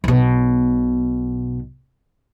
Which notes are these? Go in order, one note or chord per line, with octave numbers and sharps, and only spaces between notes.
B1 B2